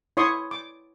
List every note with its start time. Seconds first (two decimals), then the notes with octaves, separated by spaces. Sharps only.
0.17 E4 C#5 C6 C#6 D#6
0.51 D6